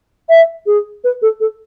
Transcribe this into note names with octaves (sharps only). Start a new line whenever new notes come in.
E5
G#4
B4
A4
A4